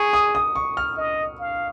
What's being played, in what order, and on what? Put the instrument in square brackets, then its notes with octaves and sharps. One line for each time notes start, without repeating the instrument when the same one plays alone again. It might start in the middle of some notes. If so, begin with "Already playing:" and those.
Already playing: [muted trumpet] G#4 [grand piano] C#6
[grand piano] D#6
D#6
C#6
F6
[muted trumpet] D#5
F5